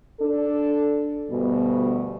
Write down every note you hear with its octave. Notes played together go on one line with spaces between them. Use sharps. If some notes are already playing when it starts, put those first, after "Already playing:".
D4 A4
D2 G2 B2